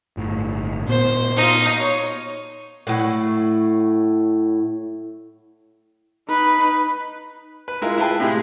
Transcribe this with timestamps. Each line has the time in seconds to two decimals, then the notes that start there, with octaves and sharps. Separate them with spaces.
0.17 G1 A2
0.88 A#2 B3 C5
1.37 D#4 F4
1.79 C#5
2.87 A2 F#3
6.29 D#4 B4
7.68 B4
7.82 G#3 E4 F4 A#4
7.98 E4 F4 G#4 B4 G5 A5
8.20 A2 C3 G#3 G#4